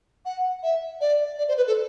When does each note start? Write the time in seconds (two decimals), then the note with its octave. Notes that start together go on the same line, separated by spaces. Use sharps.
0.25 F#5
0.63 E5
1.01 D5
1.38 D5
1.48 C5
1.57 B4
1.67 A4